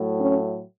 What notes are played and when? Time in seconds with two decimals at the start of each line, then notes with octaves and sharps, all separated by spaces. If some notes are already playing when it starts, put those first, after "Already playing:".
Already playing: A2 F#3 A3
0.20 C#4